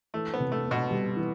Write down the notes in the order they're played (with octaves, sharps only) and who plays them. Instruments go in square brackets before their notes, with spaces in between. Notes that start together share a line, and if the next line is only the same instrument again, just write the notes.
[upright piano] E3 [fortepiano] A3
[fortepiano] B3
[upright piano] C3
[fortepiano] A3
[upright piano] B3
[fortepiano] B2
[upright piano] G3
E3